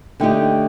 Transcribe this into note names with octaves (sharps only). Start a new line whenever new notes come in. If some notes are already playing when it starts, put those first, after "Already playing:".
D3 A3 D#4 G4 G5